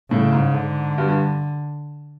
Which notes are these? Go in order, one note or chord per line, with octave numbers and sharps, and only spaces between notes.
A2 C#3
G#2
D3
G2
G2